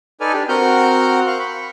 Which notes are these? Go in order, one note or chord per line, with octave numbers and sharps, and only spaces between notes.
D#4 A4 B4 D5 G#5 F6
D4 G4
C4 F#4 A#4 F#5 F6 G6
F5 C#6 F#6
B5 C#6